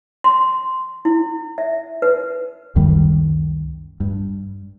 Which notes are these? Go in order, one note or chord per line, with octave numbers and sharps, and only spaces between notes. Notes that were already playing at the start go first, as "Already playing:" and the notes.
C6
E4
E5
B4
C#2 F#2 D#3 G3
G2